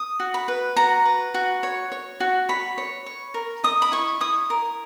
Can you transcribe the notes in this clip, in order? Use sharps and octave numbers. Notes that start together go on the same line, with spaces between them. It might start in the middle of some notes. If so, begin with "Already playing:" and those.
Already playing: D#6
F#4
B5
B4
F#4 A#5
B4
F#4
C#5
C#5
F#4
C#5 B5
C#5
C#5
A#4
D#5 D#6
B5
E4 C#6
E4 D#6
A#4